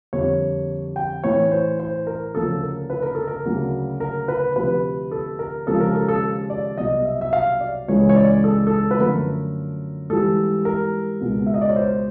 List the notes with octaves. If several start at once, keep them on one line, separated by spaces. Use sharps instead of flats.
F2 D3 G3 A#3 C#5
G5
A2 E3 A3 C#5
C5
C5
A#4
D2 C#3 F3 A#3 A4
A#4
B4
A#4
A4
A#4
D2 C#3 F#3 A#3
A#4
B4
D2 C3 F3 B4
A4
A#4
D#2 C#3 F3 G#3 A4
A#4
A4
A4
D5
C2 B2 F#3 D#5
E5
E5
F5
D5
C#2 C#3 E3 G#3 C#5
C#5
D5
A4
A4
B4
F#2 D3 F3 A3 A#4
G#2 E3 G3 A#3 A4
A#4
C#2 B2 G#3
E5
D#5
D5
C#5
C5